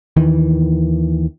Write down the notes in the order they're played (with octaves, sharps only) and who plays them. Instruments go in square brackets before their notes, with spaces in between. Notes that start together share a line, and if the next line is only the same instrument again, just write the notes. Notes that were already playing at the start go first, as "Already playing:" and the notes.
[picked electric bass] D#2 D#3 E3